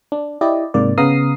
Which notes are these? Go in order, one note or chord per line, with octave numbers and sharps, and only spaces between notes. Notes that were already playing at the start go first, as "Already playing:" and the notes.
D4
E4 G4 D5 D#5
G#2 C3 A#3 D5
C#3 B3 F5 A#5 D#6 C7